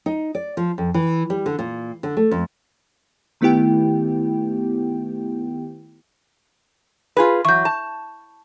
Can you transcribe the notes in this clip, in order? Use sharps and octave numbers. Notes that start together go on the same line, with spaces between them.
D#4
D5
F3
F2
E3
G3
D3
A#2
D3
A3
F2
D#3 A3 B3 E4 G4 G5
F4 G#4 B4
E3 F#3 C#6 G6
A5